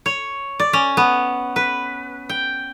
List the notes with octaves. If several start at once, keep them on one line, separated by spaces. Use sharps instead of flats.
C#5
D5
C#4
B3
B4
G5